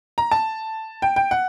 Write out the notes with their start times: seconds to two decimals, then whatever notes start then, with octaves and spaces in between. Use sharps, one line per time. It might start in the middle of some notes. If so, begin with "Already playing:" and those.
0.18 A#5
0.31 A5
1.02 G5
1.16 G5
1.31 F#5